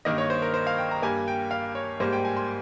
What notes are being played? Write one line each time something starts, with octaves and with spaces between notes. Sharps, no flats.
G2 D#3 A#3 D#5
C#5
C5
A#4
C5
F5
G5
A#5
G2 G3 A#3 G#5
G5
F5
C#5
G#2 G3 A#3 C5
G5
G#5
C6